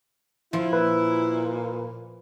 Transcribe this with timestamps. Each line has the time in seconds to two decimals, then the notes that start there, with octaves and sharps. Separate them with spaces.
0.53 F3 E4 F4
0.73 A#2 B4